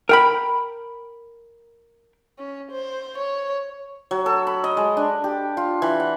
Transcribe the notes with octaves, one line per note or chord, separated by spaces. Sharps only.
A#4 G5 B5
C#4
C5
C#5
F#3
A4
B5
D#5
G#3
D4
G4
F4
E3
F#5